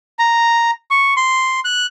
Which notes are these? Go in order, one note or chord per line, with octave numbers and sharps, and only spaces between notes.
A#5
C#6
C6
F#6